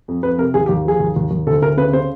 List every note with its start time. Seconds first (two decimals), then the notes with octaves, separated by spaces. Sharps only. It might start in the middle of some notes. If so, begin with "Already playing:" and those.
0.08 F2
0.23 F2 B4
0.38 C3 A#4
0.54 D#2 G#4
0.66 G4
0.69 D#2
0.85 F3 G#4
1.00 D#2
1.16 D#2
1.31 D#2
1.47 D2 A4
1.62 D2 A#4
1.77 C#3 B4
1.93 C#3 C5